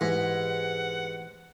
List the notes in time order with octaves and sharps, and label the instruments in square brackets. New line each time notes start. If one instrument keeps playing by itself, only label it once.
[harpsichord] G#2 [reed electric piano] E3 [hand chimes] G4 B4 [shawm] F#5